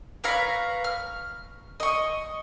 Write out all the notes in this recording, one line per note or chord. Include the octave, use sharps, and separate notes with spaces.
B4 C#5 F5 A#5
F6
D#5 C#6